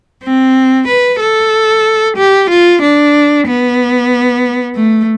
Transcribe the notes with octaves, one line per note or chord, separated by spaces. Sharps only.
C4
B4
A4
G4
F4
D4
B3
A3